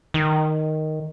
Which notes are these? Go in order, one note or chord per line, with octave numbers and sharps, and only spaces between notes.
D#3